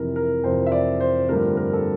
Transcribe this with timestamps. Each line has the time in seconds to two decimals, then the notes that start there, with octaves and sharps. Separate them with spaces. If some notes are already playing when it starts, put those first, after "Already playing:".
Already playing: F2 C3 E3 A#4
0.16 A#4
0.44 F2 C3 E3 C5
0.66 E5
0.72 D5
1.00 C5
1.29 G2 D3 F3 A3 C4 A#4
1.57 A#4
1.73 A4